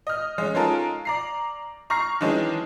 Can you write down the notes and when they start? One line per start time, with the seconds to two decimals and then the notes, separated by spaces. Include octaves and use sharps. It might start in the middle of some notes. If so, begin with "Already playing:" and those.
0.07 D#5 F6
0.38 G#3 C#4
0.55 G#3 C#4 D#4 F4 A4 A#4
1.05 D5 A#5 C7
1.90 A#5 C#6 F6 A#6 C7
2.21 D#3 E3 F#3 G#3 C#4 D4